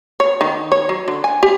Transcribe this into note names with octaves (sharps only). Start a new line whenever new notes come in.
C#5
D#3
C#5
F#3
D3
G#5
G4